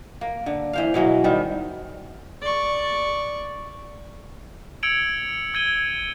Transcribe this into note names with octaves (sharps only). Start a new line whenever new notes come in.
A#3
D3
E3 C5 F5
B2 E3 F#3 G#3
D#3 G3 C4
D5 C#6
E6 G#6 C#7 D7 F7 F#7
E6 G#6 D#7 G7